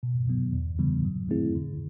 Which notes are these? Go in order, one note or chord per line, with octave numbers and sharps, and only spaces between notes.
B2
F#3 B3
E2
C#3 E3 G3 B3
F#3
A3 C4 E4 G#4
D3